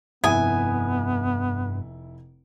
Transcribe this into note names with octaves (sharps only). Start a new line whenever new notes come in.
F1 G2 B3 E4 G#5 D#6